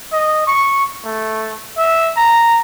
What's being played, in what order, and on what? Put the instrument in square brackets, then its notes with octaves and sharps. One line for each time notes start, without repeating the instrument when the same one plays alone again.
[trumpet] D#5
C#6
A3
E5
A#5